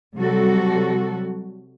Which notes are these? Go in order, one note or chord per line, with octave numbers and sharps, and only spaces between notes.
C3 F#3 G3 F#4 A4